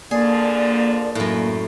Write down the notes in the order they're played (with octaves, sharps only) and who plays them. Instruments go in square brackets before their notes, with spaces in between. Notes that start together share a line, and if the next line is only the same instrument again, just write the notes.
[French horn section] A#2 D3 F3 [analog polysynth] A#3 [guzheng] G#4 [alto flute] D5
[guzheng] F#2 A2